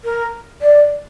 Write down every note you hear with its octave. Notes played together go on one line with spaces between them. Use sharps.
A#4
D5